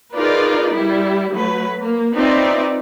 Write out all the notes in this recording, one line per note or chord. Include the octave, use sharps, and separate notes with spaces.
D#4 F4 G#4 A#4 B4 D5
G3 E4
F#3 A3 B4
A#3
C4 D#4 F4 B4 D5 E5